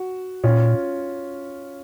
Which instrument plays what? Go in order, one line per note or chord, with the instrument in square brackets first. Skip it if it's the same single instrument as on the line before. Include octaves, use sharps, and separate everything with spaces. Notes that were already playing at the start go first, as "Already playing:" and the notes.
Already playing: [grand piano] F#4
[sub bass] A#2 [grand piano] C#4 F4